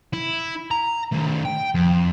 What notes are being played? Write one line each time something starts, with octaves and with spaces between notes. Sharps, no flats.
E4
A#5
D#3 A3
G5
F2